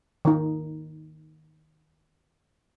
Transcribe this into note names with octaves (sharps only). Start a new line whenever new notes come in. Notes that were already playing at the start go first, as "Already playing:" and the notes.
D#3 D#4